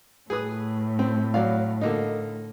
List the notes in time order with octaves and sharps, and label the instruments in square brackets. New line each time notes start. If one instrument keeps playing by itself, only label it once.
[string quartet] A2 [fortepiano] G#4 B4 D#6
[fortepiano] C4
F#3 D5 F5
D3 A#3 D#4